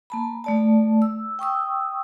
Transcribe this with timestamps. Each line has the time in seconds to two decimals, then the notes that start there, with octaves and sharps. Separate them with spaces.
0.10 A#3 A5 B5
0.44 A3 D5 A5
1.02 E6
1.39 G5 C#6 D#6 E6